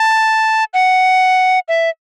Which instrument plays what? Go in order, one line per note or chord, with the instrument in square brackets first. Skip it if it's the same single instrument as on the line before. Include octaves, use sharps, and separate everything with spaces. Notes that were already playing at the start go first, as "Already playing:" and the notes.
Already playing: [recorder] A5
F#5
E5